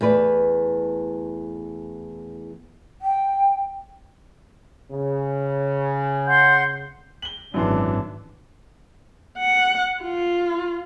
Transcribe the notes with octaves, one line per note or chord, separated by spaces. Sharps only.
E2 A3 B4 D5
G5
C#3
F#5 C6 G6
F#7 G7
G#1 F#2 E3 D4 C6
F#5
F4